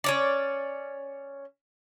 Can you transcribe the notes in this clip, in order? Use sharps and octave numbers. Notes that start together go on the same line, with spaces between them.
C#4 C#5 D5